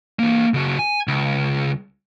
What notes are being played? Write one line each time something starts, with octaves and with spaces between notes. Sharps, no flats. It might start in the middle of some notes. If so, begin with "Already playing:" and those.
E3 A#3
C#3 F#4
G#5
C#2